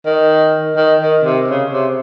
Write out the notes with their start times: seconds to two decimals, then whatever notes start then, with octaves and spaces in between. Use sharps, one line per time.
0.05 D#3
0.76 D#3
1.00 D#3
1.24 C3
1.48 C#3
1.72 C3